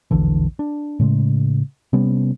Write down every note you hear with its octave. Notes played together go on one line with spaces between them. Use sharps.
E1 A#1 D3 E3
D4
A2 C#3 G#3
C3 G3 B3 C#4